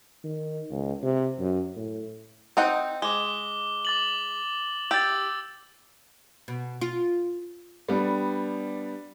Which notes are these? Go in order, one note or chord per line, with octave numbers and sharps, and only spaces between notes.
D#3
C#2
C3
F#2
A2
C4 D#4 F#5
G#3 D6 G7
D6 A6 F#7
G4 E6 A6
B2
F4
G3 B3 D4